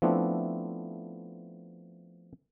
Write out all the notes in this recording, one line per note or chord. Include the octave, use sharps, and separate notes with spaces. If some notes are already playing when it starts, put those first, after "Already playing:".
F3 A3 B3 C4 D4 E4